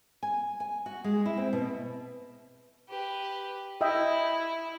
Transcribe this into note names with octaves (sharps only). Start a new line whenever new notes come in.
G#5
G#5
F#4
G#3
E4
C4
B2
G4 B4
E4 D#5 E5 G5